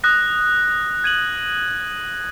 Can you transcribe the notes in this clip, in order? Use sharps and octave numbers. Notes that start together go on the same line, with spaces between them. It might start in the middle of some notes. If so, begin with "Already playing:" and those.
D#6 F#6 A#6
G#6 D#7 F#7